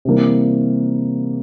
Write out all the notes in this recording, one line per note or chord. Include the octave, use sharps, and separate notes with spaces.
C3 E3 G3 A#3